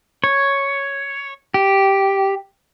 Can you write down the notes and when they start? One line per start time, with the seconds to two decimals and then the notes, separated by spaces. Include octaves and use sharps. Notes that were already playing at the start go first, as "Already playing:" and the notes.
0.24 C#5
1.54 G4